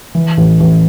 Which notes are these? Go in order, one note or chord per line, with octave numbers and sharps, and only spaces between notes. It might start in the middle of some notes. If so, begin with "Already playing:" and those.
E3
A1
A1